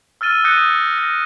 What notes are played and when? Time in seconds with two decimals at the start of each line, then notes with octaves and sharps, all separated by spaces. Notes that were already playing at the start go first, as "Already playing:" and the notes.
0.21 E6 F6 A6 D#7 G7
0.44 D#6 F#6 G6 A#6 C#7 D#7
0.98 A#6